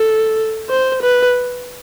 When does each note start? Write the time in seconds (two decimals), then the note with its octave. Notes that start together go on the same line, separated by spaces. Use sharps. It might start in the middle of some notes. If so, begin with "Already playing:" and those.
Already playing: A4
0.70 C5
1.03 B4